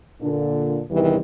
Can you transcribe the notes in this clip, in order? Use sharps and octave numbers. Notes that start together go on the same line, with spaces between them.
A#2 D3 D4
E2 G2 C3 D#3 E3 G3